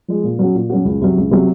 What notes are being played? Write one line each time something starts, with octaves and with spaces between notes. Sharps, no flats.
F3 G#3
A#2
F#3 C#4 F#4
A#2
F#3 C#4 F#4
C#2
C3 F#3
C#2
C3 F#3